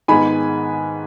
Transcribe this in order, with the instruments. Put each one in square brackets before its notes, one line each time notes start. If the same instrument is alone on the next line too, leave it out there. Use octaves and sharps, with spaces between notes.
[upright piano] G#2 D#3 G#3 B3 G#5 B5